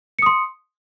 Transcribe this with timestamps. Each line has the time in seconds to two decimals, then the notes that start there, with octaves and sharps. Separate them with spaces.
0.19 C#7
0.22 D#6
0.26 C6